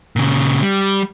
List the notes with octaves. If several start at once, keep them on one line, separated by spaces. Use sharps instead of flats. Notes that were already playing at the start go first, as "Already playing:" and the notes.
A#2 C#3
G3